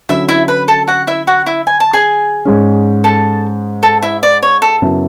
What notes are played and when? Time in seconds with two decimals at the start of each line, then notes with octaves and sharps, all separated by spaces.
0.09 D3 F#3 C#4 E4 E5
0.29 E4 E5
0.48 B4 B5
0.68 A4 A5
0.88 F#4 F#5
1.07 E4 E5
1.27 F#4 F#5
1.46 E4 E5
1.67 G#5
1.80 A5
1.93 G#4 G#5
2.45 G#2 G#3 C#4
3.04 A4 A5
3.83 A4 A5
4.02 E4 E5
4.23 D5
4.42 C#5
4.62 A4
4.82 F#2 C#3 F#3 B3 E4